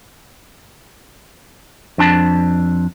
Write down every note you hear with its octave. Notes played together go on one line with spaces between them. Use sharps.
F2 D4 A5